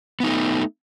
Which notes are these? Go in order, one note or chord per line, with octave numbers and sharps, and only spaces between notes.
A3 B3 D#4